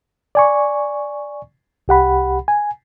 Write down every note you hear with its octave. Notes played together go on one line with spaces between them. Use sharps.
D5 G#5 C#6
C2 G4 F#5 B5
G#5